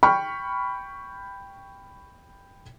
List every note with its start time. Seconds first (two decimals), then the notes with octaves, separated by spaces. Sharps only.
0.03 G5 B5 C#6 F6